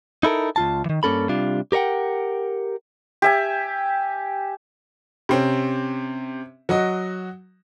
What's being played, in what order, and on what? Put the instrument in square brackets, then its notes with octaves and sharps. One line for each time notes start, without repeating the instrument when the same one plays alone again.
[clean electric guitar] D#4 E4 A4 A#4
C#2 F4 A5
D#3 E3
G2 A#3 C#4 A4 B5
C3 G3 D4 F4
G4 A#4 C#5 F#5 G5
[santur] G4 E5 G#5
[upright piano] C3 C4 C#4
F#3 F#4 D#5